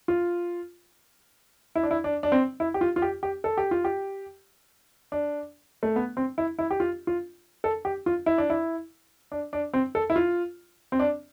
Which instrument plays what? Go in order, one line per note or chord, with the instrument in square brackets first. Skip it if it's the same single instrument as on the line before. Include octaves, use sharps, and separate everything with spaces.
[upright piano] F4
E4
D4
E4
D4
D4
C4
E4
G4
F4
F4
G4
G4
A4
G4
F4
G4
D4
A3
B3
C4
E4
E4
G4
F4
F4
A4
G4
F4
E4
D4
E4
D4
D4
C4
A4
E4
F4
C4
D4